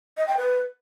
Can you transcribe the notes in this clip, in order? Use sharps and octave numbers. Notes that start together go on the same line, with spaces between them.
D#5
G5
B4